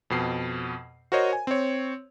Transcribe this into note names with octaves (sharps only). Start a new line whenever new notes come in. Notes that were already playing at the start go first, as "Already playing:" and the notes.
F2 B2 C7
F#4 A#4 C5 C#5 D#5
G#5
C4 C#5